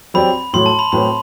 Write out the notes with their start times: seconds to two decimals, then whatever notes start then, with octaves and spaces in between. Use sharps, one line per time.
0.14 F#3 C4 G4 D5 B5
0.53 A2 F#3 A3 C6
0.66 A5
0.79 B5
0.92 A2 F#3 C4 E4 B4 B5